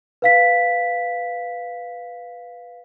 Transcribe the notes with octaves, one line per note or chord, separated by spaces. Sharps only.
B4 F5 B6